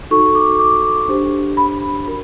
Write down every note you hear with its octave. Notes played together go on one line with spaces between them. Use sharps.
D#4 F#4 A4 C#6
D6
D6
D4 G4 C5
B5
F#4 A#4